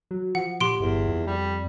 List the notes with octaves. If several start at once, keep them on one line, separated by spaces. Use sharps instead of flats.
F#3
F3 F#5
A#2 G4 C6 D7
G1 E2
F2
G3